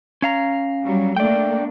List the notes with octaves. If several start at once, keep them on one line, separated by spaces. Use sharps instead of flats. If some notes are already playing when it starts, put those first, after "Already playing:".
C#4 F5 A#5
F#3 G3
A3 A#3 D4 D5 G5